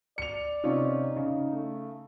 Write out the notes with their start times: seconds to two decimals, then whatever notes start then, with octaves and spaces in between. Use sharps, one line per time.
0.18 D5 C#7 F7
0.64 C3 C#4 D#4 F4
1.16 C#3
1.53 A3